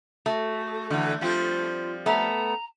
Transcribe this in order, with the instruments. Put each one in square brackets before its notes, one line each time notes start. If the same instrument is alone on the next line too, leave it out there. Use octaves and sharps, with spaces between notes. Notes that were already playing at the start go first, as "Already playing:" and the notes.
[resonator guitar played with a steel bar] A3 [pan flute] F#4
[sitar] D3 E3
[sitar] F3 G3 C4 [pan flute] F4
[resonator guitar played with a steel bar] A3 B3 [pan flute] A#5